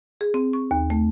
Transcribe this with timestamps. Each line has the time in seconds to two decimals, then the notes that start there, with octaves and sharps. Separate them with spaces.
0.21 G#4
0.34 C4
0.53 C#6
0.71 D#2
0.90 A3